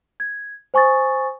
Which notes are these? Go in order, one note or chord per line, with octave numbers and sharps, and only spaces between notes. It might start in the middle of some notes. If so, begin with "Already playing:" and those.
G#6
C5 G#5 C#6 D#6 A6